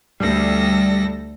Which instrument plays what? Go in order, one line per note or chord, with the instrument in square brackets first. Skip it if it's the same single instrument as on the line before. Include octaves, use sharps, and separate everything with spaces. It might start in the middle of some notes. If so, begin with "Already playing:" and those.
[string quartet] D2 A4 A#6 [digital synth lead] G3